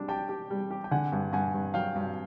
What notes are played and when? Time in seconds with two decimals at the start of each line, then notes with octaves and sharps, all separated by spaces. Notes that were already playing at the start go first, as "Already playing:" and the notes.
Already playing: G3 D4
0.08 G4 G5 A5
0.29 G4
0.50 G3
0.71 G4
0.84 G5
0.91 D3 F#5 G#5
1.12 G2
1.33 G2 F#5 G#5
1.54 G2
1.74 F#3 F5 G5
1.95 G2